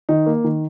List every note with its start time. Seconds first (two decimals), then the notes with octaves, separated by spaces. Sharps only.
0.09 D#3 D#4
0.26 A#3
0.44 D#3